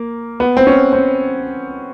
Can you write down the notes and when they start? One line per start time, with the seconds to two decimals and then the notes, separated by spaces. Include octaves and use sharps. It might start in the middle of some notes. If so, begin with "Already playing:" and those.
Already playing: A#3
0.40 B3
0.57 C4
0.67 C#4
0.93 C4